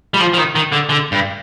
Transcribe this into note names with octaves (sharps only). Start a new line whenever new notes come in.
G3
F3
F3
D#3
D#3
D3
D3
G2